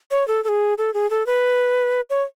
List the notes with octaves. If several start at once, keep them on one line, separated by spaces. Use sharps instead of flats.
C#5
A4
A4
G#4
A4
G#4
A4
B4
C#5